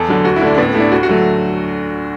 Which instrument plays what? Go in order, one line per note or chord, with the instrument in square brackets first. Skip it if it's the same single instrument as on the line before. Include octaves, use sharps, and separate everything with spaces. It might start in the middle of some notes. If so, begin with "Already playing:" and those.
Already playing: [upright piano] E2 A4
D3 F#3
D2 F#4
E4
D3 A3 D4
D4
A2 B3
B3
A3 E4
D4
D2 F#4
F#4
D3 F#3 A3